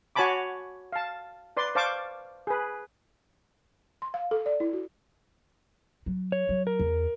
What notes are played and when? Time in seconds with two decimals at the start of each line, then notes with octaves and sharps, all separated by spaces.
0.16 F#4 C#5 G#5 A5 B5 D6
0.92 F5 A5
1.57 B4 D5 C6
1.75 C5 D5 F5 A5 C#6 D6
2.47 G#4 B4
4.02 C6
4.14 F5
4.31 A4
4.46 D5
4.60 E4
4.73 F#4
6.06 F#3
6.32 C#5
6.49 F#3
6.67 A#4
6.79 E2